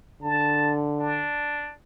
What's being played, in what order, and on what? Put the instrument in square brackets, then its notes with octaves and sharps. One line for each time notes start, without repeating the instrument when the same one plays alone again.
[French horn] D3 [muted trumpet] A5
[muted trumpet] D4